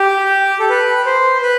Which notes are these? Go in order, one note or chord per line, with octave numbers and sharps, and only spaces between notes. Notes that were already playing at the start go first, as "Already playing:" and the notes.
Already playing: G4
A4
B4
C5
B4